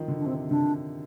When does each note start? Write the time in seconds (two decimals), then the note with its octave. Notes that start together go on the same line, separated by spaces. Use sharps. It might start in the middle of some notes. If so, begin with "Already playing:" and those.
Already playing: D#3 F3
0.08 D3
0.19 D4
0.26 C3 C4
0.50 D3 D4